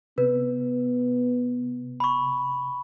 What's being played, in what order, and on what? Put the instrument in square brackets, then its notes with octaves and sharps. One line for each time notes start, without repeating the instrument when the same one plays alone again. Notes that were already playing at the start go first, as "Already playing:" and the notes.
[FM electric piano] C3 [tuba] B3 [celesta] B4
[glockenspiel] B5 C#6